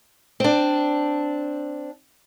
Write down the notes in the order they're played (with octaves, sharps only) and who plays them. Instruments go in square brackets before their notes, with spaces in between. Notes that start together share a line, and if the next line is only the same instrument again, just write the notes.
[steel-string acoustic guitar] C4 D4